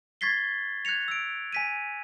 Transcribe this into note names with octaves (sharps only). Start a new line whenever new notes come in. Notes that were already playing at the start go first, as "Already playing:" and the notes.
C#6 G#6 A6 B6 C7 G7
F#6 G#6 A#6 C#7 F7
E6 D7
G#5 B6 D#7